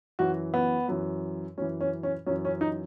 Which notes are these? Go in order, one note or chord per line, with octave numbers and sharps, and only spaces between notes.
F#2 E3 F#4
B3
F#2 E3
F#2 E3 C#4
C#4
C#4
F#2 E3 C#4
C#4
D#4